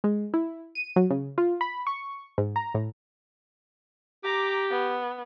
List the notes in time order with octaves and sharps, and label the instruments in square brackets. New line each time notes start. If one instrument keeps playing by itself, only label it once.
[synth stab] G#3
E4
D#7
F#3
C#3
F4
B5
C#6
G#2
A#5
A2
[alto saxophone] G4 [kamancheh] A#5 D6
[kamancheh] B3